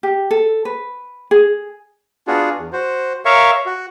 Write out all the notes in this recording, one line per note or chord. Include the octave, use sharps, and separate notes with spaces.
G4
A4
B4
G#4
B3 D4 F4 F#4 G#4
E2
F#4 C5
A#4 C#5 E5 F5 C#6
F#4